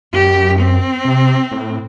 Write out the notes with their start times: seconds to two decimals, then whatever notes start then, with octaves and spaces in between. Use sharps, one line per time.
0.13 F#2 G4
0.59 C4
1.05 C3
1.52 A2